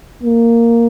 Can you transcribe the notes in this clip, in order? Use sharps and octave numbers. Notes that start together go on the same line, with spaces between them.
A#3